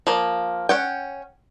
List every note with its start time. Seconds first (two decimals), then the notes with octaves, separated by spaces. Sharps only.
0.07 F3 A#3
0.69 C#4 F#5 G5